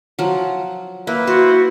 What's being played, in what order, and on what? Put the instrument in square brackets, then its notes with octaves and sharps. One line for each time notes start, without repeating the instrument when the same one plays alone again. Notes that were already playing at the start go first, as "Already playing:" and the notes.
[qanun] F3 F#3
[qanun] A#3 [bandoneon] E4 B4
[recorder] F#4 [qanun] C5